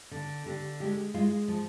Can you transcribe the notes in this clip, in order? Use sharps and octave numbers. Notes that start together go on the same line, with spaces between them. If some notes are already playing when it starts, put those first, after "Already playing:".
D3
D3 G4
G#3 G4
G#3 F4
F3